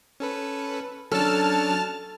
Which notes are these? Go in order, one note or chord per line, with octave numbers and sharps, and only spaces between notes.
C#4 A4 B4
F#3 C#4 D4 A4 A5 F6